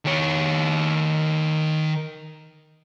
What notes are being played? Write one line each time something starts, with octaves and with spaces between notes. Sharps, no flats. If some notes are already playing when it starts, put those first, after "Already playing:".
D#3 C#5